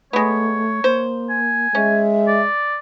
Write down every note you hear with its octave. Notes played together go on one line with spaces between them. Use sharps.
G#3 A3 B3 C#5
A#3 C5
G#5
G#3 C#4 E5
D5